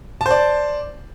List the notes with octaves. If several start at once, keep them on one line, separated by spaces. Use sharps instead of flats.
C5 D5 A5